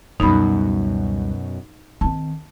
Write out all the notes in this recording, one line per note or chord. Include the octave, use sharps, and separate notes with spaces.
C#2 F#2 B2 G3 D#4 B5
D#3 C4 A5